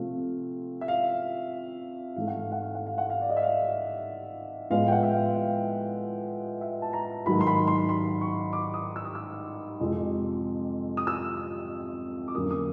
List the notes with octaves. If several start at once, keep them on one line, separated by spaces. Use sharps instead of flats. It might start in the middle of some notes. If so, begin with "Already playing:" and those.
Already playing: C3 F3 A3 C4 F5
E5
F5
G#2 E3 A3 F5
F#5
F5
F#5
F5
F#5
F5
F#5
F5
D5
D#5
E5
F5
A2 F3 G#3 B3 F5
G5
F#5
E5
F5
F5
E5
A5
A#5
G#2 D#3 F#3 B5
C6
B5
C6
C6
C#6
D6
D#6
E6
D#6
E6
F2 C3 F3 G#3
D#6
E6
D6
F2 D3 F#3 A#3 C#4 D#6
D#6